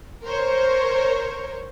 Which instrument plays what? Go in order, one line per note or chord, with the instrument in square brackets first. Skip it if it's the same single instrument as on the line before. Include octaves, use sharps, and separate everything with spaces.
[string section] A#4 C5 C#5